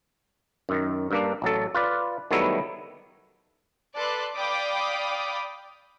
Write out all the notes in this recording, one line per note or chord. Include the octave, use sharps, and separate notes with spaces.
F#2 D#3
G2 A#3 D4
A1 F#3 A4
F4 B4 D5
D#3 F#3 G3 A3 B3 E4
A4 B4 D5 C6 F#6
D5 F5 G5 B5 D6 D#6